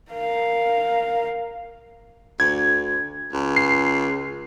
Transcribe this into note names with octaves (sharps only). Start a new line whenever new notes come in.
A#4 F5
D2 G#6
C#2
C7